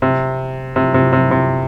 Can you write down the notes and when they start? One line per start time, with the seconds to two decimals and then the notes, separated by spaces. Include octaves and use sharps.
0.02 C3
0.76 C3
0.94 C3
1.13 C3
1.31 C3